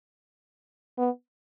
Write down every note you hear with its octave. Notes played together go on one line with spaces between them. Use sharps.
B3